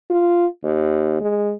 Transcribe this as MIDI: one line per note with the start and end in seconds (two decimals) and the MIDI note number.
0.10 0.46 65
0.64 1.18 39
1.21 1.53 56